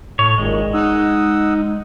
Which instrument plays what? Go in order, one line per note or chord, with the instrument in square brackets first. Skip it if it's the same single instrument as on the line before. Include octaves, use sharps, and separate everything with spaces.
[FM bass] A2 [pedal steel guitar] C#5
[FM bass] G#1 [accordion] F#2 A#2 D#3 [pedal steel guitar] G#3
[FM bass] D#4 [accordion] F#5 D#6 E6